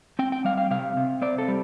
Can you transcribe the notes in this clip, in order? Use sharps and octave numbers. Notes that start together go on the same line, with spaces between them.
C4 G5
G5
G3 F5
F5
C3 F5
C3
C4 D5
A4
G3